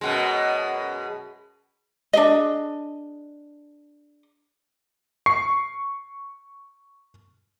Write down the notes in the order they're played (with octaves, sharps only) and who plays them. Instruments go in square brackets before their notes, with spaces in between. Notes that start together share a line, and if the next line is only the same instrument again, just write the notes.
[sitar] F#2 B2 G#3
[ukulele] D4 G#4 D#5
[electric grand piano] C#6 C7